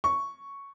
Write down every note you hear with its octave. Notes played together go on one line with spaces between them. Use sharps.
C#6